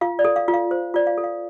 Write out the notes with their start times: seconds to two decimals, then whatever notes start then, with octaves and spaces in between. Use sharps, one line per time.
0.01 F4 F5
0.19 D5
0.25 A4
0.36 F5
0.48 F4
0.54 F5
0.71 C5
0.94 F4 D5
1.07 F5
1.18 A4
1.24 F5